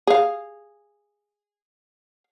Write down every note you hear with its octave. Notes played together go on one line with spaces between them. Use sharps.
G#4 F5